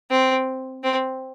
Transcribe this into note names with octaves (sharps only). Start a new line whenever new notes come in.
C4
C4